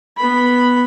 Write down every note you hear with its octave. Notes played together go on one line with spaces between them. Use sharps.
B3 B5